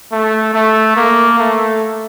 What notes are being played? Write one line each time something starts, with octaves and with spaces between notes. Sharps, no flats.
A3
A3
A#3
A3